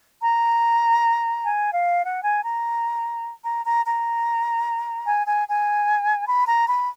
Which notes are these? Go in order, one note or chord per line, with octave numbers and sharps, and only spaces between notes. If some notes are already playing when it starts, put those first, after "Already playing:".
A#5
G#5
F5
F#5
G#5
A#5
A#5
A#5
A#5
G#5
G#5
G#5
B5
A#5
B5